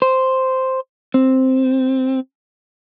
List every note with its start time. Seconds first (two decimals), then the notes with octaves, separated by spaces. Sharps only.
0.02 C5
1.14 C4